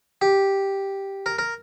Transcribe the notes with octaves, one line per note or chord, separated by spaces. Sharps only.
G4
A#4
A#4